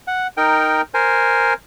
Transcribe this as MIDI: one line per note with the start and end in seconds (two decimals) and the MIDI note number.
0.07 0.27 78
0.37 0.82 63
0.37 0.82 70
0.37 0.82 79
0.94 1.53 70
0.94 1.53 72
0.94 1.53 80